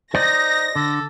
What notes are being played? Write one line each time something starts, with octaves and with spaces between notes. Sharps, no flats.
D#4 C5 D5 D#5 A#6
D3 A4